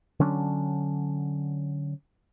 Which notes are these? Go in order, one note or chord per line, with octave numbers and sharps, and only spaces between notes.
D3 F#3 C#4 D4